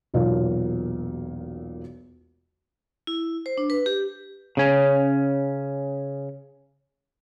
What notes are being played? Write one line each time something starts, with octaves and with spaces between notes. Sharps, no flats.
E1 B1 A#2 C#5 F5
E4
C5
D4
B4
G4
C#3 C#4